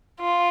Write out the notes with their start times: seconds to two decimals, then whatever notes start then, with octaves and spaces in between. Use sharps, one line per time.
0.20 F4